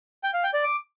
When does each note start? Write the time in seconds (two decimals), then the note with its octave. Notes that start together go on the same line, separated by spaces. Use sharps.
0.23 G5
0.34 F5
0.44 G5
0.54 D5
0.64 D6